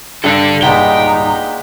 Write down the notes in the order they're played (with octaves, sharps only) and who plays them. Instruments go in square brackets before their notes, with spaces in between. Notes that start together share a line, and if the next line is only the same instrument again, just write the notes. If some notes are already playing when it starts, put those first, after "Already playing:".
[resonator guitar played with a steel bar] G2 [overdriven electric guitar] A4 D5
[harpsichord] A#2 G#3 B3 [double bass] D#4 [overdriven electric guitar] G5